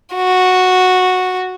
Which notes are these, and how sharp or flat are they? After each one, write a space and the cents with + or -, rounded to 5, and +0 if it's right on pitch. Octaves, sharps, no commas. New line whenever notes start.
F#4 -10